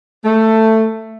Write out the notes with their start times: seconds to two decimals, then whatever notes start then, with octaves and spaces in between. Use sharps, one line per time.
0.25 A3